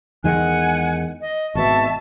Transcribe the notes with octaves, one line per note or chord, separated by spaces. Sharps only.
E2 D#3 G#3 F#5 G#5 F#6
D#5
G#1 B2 E5 A5 C#6